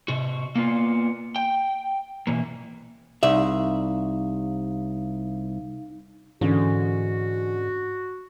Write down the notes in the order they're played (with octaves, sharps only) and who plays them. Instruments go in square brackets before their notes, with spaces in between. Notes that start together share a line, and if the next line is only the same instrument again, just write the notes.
[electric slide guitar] C3 F#4
A#3 B3 F4
G5
B2 E3 A#3
[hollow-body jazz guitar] C2 E5 [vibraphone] D#4 F5
[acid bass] G#2 [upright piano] D3 C#4 [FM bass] E3 [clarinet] F#4